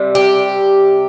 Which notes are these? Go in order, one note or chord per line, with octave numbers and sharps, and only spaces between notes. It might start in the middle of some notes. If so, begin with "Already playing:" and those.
Already playing: C3 G3
G4